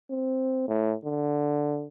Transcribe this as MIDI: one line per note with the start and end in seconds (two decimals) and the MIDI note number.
0.10 0.66 60
0.68 0.95 45
1.05 1.88 50